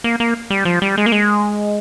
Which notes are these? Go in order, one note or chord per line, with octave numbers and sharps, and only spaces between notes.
A#3
A#3
G3
F3
G3
G#3
A#3
G#3